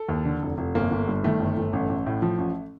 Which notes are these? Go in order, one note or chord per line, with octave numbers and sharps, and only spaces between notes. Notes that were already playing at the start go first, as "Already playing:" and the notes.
Already playing: A4
D#2
D3
F1
F1
G1 A#3
G1
G2
D#3 A3
G1
G1
A1
A1
A2
F3
A1